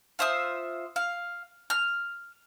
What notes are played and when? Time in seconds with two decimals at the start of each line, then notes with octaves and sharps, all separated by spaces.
0.19 F4 C5 E5 D#6
0.96 F5
1.70 F6